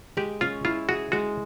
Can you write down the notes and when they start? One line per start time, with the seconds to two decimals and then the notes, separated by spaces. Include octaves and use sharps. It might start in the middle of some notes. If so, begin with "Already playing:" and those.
0.17 G#3 G4
0.41 C#4 F4
0.65 E4 F4
0.89 F#4 G#4
1.12 G#3 F#4